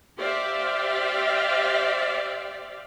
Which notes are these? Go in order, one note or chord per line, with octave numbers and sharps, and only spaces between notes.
G4 C5 D5 E5 F5